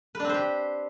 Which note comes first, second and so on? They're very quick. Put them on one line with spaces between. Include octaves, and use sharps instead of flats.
B4 D4 C4 C5 G4